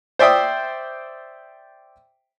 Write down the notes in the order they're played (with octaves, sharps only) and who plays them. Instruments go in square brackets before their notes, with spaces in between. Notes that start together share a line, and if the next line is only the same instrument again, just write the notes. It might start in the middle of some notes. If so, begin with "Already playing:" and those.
[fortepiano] C5 D5 E5 G5 D#6